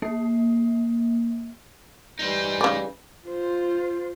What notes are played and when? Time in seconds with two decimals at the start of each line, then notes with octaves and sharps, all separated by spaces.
0.02 A#3
2.19 E3 G3 D#4 C5
2.61 C#3 D5
3.27 F4 C5